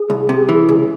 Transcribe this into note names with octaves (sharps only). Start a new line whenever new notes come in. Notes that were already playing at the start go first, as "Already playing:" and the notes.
Already playing: G#4
C2
C3
E3
C#2